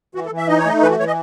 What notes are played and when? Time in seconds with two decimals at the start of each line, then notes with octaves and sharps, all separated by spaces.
0.15 E3 F#4
0.26 A4
0.31 E3
0.37 E5
0.48 D#4 D#5
0.58 C#5
0.66 A3 D#5
0.82 E3 B4
0.91 F#4
0.99 E3 C#5
1.07 D#5